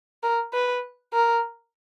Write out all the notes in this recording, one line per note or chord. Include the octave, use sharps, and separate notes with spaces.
A#4
B4
A#4